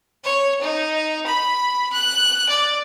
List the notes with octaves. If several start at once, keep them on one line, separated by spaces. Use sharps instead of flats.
C#5
D#4
B5
F#6
D5